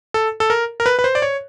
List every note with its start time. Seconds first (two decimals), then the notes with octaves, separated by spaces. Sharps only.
0.14 A4
0.40 A4
0.50 A#4
0.80 A#4
0.86 B4
0.99 B4
1.04 C5
1.15 D5
1.22 C#5